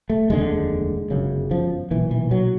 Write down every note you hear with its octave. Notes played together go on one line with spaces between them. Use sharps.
A3
F1 D#2 D3 G#3
G1 F#2 C#3
F3
B1 A#2 E3
E3
F#3